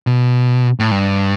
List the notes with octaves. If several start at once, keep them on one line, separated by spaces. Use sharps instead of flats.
B2
A2
G2